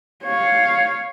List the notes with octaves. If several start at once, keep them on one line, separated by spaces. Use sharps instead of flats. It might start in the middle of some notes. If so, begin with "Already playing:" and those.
C#5 F5